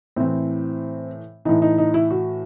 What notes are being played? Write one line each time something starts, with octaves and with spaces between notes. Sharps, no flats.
A2 E3 C4
A2 E3 D#4
D#4
D#4
E4
F#4